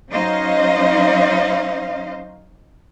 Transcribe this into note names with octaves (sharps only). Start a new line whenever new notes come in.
F#3 C#4 D#4 C5 D#5 F5